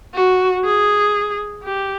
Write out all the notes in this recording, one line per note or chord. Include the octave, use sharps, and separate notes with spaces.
F#4
G#4
G4